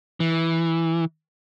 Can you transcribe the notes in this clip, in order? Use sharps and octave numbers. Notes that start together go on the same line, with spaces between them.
E3